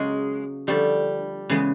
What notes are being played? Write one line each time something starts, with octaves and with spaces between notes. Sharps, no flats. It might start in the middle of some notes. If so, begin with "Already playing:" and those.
Already playing: C#3 F#3 G#3 A#3
D3 F3 G3 A3
C#3 E3 G#3 B3